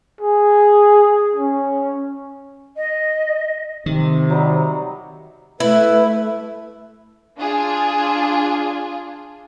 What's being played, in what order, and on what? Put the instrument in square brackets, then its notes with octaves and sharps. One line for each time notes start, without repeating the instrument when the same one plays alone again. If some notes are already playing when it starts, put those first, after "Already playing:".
[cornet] G#4
C#4
[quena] D#5
[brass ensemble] C3 [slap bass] D#3
[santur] F#3 G3 D#4
[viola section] A3 [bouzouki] E4 [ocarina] B4
[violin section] D4 F4 G#4